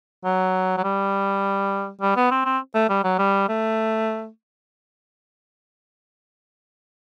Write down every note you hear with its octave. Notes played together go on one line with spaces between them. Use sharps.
F#3
F#3
G3
G3
B3
C4
C4
A3
G3
F#3
G3
A3